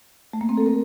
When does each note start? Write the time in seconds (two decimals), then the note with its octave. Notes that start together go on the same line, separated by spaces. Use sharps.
0.33 A3
0.41 A#3
0.49 C4
0.57 A4
0.66 A#4